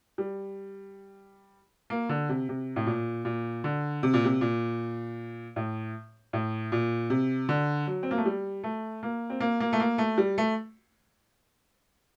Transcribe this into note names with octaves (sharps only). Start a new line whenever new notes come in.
G3
A#3
D3
C3
C3
A2
A#2
A#2
D3
C3
A#2
C3
A#2
A2
A2
A#2
C3
D3
F#3
C4
A#3
A3
G3
A3
A#3
C4
A#3
A#3
A3
A#3
A3
G3
A3